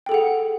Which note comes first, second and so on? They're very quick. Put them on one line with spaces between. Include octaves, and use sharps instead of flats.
G5 A4 G#4 F#5